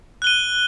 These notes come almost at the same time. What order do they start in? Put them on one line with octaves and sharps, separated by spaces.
F#6 G7 D#7